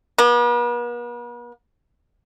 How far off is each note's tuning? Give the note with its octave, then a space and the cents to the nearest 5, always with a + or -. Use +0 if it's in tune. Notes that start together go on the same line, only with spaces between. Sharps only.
B3 -45